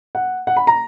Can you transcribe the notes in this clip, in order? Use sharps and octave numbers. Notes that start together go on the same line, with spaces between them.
F#5
F#5
B5
A#5